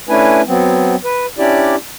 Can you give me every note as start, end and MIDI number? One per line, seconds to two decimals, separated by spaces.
0.09 0.42 57
0.09 0.42 61
0.09 0.42 62
0.09 0.42 64
0.09 0.42 71
0.09 0.42 80
0.47 0.96 54
0.47 0.96 59
0.47 0.96 60
1.04 1.26 71
1.38 1.76 61
1.38 1.76 62
1.38 1.76 64
1.38 1.76 67
1.38 1.76 74